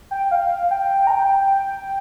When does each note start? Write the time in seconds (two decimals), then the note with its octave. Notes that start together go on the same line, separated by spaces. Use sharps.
0.11 G5
0.31 F5
0.71 G5
1.07 A#5
1.11 G5